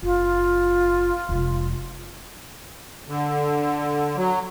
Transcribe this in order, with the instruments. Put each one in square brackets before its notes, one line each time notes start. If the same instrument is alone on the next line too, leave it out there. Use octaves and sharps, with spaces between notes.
[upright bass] F#1 [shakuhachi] F4
[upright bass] F1 G#3
[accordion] D3
F#3